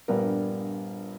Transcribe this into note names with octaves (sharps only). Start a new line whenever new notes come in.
A#1 G2 G3 B3 A#4